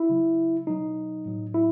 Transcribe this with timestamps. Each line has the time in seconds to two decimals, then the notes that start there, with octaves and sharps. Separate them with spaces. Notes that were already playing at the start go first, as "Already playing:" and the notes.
Already playing: E4
0.09 C#3 F#3
0.67 B2 F#3 D#4
1.26 A2 F#3
1.54 E4